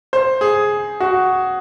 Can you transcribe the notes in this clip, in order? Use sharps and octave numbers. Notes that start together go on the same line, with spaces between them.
C5
G#4
F#4